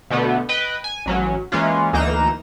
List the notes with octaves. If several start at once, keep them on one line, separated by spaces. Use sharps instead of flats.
B2 D3 A3 B3
B4 D#5 G5
G#5
A1 F#3 C#4
E3 G#3 A#3 C#4 F4
D2 E3 A#3 D#4 A#5 E7